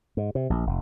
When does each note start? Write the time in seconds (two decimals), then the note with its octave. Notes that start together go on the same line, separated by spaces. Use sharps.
0.17 G#2
0.35 C3
0.50 A#1
0.66 F1